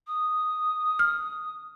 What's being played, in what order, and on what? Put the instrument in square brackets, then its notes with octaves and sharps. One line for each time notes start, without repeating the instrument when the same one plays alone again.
[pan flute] D#6
[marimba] F6